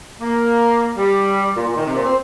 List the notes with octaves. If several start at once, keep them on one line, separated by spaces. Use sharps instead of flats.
A#3
G3
A#2
A#2
D#3
C3
A#2
C4